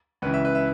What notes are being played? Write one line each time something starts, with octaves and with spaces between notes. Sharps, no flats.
C#2 C#3 E3 B4
E5
B4
E5